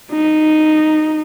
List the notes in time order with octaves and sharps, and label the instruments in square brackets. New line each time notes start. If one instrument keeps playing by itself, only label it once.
[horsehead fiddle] D#4